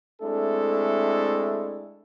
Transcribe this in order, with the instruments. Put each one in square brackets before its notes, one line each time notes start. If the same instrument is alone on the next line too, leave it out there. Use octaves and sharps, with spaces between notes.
[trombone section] G#3 A3 C4 D4 E4 A4